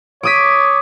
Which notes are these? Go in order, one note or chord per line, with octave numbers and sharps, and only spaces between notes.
C#5 D6 D#6 B6